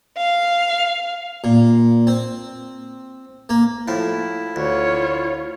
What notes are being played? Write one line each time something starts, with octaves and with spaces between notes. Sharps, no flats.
F5
A#2
C4
A#3
A2 F3 E4
D2 F4 C#5